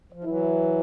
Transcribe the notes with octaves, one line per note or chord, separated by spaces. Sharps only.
F3
E3 F#3 E4